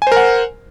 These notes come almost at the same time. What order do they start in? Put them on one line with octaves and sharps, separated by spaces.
G#5 C5 A#4 F#5